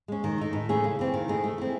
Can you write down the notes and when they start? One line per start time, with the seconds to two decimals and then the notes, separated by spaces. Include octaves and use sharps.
0.08 G#3 C#4
0.24 D#3
0.38 A3 D#4
0.53 A2
0.69 E3 A3 C#4 G#4
0.84 C#3
0.99 E3 C4
1.14 D#3
1.28 A3 D#4 G#4
1.44 A3
1.58 C4 E4